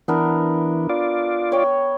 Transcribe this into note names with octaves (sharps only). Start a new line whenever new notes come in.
E3 B3 D4 A#4
F4 D5
C#5 G5